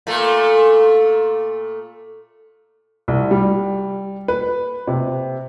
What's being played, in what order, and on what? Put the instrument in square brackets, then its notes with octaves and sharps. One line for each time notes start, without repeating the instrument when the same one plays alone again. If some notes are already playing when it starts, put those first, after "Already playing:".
[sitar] A#2 A3
[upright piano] C2
G3
B4
C3